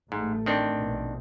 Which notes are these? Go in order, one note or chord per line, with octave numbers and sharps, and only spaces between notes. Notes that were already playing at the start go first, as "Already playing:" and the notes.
A1 G#2 A3
D#3 C4 D4
A#1 B2